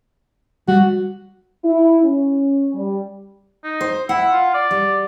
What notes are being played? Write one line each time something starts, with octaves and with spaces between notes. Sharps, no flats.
G3 F#4
E4
C#4
G3
D#4
C5
E4 F#5
F4
D5
G3